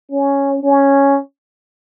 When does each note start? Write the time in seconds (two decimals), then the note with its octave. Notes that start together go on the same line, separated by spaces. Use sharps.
0.11 C#4
0.63 C#4